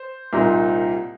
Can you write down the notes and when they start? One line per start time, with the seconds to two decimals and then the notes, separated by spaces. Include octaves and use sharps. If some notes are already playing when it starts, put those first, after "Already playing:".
Already playing: C5
0.33 C2 A#2 G3 D#4